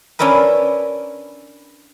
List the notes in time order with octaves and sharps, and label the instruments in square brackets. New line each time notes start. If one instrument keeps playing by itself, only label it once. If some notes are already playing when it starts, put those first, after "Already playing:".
[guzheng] C#4 D4 E4 A#4 B4